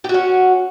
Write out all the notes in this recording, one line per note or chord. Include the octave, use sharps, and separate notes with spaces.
C#4 F#4 G4